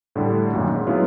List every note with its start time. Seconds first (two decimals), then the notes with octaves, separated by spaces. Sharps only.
0.16 A2 D3 G3
0.53 F#2 A#2 D#3
0.74 G#2
0.87 F#3 G#3 B3 C#4 E4 F4